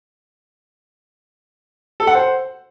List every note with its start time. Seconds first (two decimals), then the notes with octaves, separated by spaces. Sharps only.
2.00 A4
2.07 F#5
2.15 C5